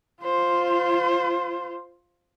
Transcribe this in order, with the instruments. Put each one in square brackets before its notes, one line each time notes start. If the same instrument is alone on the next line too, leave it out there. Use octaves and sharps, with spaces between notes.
[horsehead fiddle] F4 C5